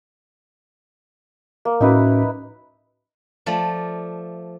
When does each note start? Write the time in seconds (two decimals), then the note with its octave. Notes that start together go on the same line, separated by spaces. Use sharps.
1.65 A#3
1.81 A2 C#4 D#4 E4 F#4 B4
3.46 F3 A3 D5